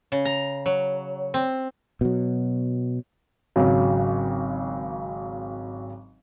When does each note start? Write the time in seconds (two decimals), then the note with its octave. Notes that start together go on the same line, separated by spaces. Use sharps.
0.12 C#3
0.25 A#5
0.66 F#3
1.34 C4
2.01 B2 F#3
3.56 G#1 C#3 F#3